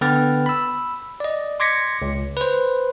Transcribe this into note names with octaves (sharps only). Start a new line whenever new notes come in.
D3 B3 B4 G5 F6 A6
B5 E6
D5 D#5
C6 D6 G#6 A#6 B6 C#7
C#2
B4 C5